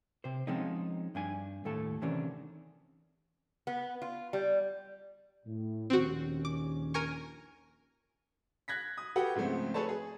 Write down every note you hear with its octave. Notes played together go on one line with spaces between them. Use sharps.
C3 C5
F3 G#3 C4 C#4 D#4
G2 D4 G#5
D#2 A2 A3 A4
C3 D#3 E3 C#4 D4
B3
F4
G3
A2
A#1 D#2 C4 C#4 F#4
D6
A#4 G#5 C#6
F#6 G#6 A#6 B6
D#6
F#4 G4 A4 B4 F#5 G5
G#2 C#3 F3 A3 C4
G#4 A4 B4 C#5 A5
G#4